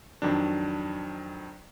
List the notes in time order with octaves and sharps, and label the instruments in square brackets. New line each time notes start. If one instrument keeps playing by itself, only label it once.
[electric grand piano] F2 D#3 F#3 D4